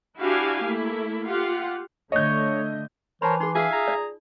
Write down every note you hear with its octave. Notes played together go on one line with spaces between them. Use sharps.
D4 E4 F#4 G4 F5 G#5
A3 A#3 E4
F4 G4 F5 F#5
D3 A3 C#5 D#5 G6
E3 A#4 C5 C#5 A5 B5
D#4 G#4 C6
F4 G#4 E5 F5 G#5
G#4 A#5
D5